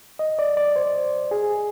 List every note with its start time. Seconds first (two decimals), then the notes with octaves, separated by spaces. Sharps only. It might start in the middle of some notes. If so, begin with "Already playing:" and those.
0.19 D#5
0.39 D5
0.57 D5
0.76 C5
1.31 G#4